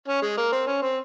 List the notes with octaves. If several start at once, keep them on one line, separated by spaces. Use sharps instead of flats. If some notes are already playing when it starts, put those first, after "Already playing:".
C#4
G#3
A#3
C4
C#4
C4